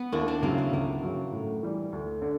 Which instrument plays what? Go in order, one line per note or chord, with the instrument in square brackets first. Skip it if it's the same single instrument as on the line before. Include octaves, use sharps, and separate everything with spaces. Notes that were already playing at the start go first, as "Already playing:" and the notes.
Already playing: [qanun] B3
[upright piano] D#2 [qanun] D4 E4
[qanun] C4 D4
[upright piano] C#3 F#3 [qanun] A#3 C4
[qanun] B3
[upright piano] C#2 [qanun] A#3
[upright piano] C#3 F#3
A2
E3 G3
D2
D3